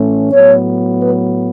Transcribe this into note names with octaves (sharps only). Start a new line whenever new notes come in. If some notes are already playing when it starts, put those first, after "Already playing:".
Already playing: A2 E3 A3 C#4
A2 F#3 B3 C#5
B4